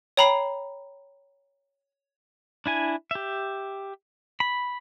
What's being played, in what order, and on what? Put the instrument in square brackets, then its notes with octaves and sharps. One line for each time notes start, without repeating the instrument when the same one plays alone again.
[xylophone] C#5 G5 A#5 B5 C7
[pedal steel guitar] D4 E4 G#5
G4 E5
B5